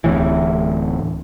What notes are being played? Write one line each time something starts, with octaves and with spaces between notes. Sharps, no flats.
D1 A2 E3